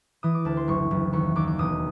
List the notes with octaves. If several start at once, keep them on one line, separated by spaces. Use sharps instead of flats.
E3 D#6
D6
D2 A5
C6
F#1 C#6
F#1
D#2 C#6
D#2 D6
D6
E1 D#6